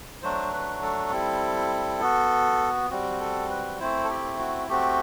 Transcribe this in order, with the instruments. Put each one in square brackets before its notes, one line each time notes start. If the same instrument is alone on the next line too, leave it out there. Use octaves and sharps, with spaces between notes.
[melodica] F#3 A3 D4 F#4 C5
B4
A4
G3 C4 E4
B3 F#4
G3 C4 F#4
A4
B4
A3 C4 E4 C5
A4
G4
F#4
A3 C4 F#4 G4